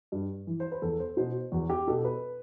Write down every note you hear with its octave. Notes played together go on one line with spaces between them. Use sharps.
G2
E3
C5
B4
E2 A4
C5
B2 C5
E2 F#4
G4
B2 A4
B4